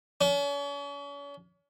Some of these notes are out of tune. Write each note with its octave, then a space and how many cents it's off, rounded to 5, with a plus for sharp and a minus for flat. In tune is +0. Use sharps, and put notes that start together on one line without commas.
C#4 +40